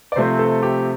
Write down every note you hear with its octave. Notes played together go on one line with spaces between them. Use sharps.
D5
C3 F3 A3 C4 C5
A4
G4